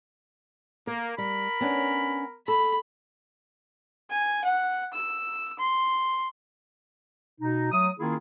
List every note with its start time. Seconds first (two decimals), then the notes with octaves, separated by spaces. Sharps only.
0.87 A#3 A#4
1.18 G3 A#4 B5
1.61 B3 C#4 D4
2.48 A4 B5
4.10 G#5
4.44 F#5
4.93 E6
5.59 C6
7.40 B2 D#4
7.71 F#3 A3 D#6
7.99 D#3 A#3 C#4 E4 F4 G#4